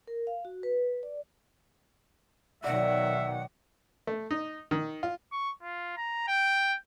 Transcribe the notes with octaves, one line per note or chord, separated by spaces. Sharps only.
A#4
F5
F#4
B4
D5
B2 D#3 F#3 D5 E5 F#5
A3
D#4
D#3
F4
C#6
F4
A#5
G5